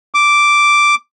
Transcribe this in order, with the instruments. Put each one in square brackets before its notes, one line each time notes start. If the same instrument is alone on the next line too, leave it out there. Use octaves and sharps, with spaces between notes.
[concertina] D6